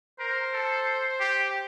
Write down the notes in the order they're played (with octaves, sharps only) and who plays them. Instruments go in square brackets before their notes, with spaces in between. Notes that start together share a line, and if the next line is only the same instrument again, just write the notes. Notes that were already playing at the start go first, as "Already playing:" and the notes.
[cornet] A#4 [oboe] C5
[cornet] A4
G4